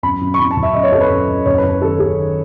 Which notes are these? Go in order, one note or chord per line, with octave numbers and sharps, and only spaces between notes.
F#2 B5
F#2
C#6
F#2 B5
A5
F#1
E5
F#2 D#5
C#5
F#2 A4
B4
F#2
F#2
F#1 C#5
B4
F#1
B4
D#3 A4
F#2 G#4
D#3